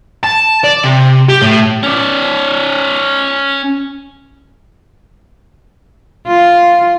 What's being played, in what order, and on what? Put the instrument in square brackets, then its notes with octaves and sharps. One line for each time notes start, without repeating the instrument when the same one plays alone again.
[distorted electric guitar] A5
D5
C3
G4
A2
[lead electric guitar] C#4 D5
[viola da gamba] F4